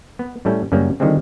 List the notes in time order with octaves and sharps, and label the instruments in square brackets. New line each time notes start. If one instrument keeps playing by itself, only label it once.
[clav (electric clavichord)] B3
A2 G3 A3 C#4
F#2 C#3 G3 A#3 C#4
D3 D#3 F3 G3 G#3 C4